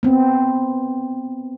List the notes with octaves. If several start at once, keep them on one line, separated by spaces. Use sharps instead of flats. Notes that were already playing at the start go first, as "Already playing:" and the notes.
B3 C4